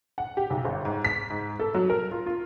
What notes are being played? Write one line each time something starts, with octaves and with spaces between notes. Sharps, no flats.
F#5
G4
B1
G1
G#2
B6
G#2
A4
F#3
A#4
F4
F4